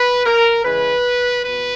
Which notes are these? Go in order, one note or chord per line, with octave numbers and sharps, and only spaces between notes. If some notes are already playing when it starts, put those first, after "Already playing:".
Already playing: B4
A#4
C#3 E3 G#3 B4
B2 B4